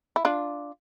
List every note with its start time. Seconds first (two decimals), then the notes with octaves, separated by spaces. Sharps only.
0.16 E4
0.25 D4 F4